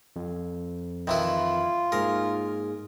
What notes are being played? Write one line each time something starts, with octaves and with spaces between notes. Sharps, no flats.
F2
D#3 E3 E4 F4
G#2 A#3 G#4 A#4